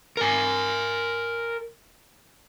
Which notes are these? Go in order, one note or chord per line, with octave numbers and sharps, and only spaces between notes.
A#4 G#5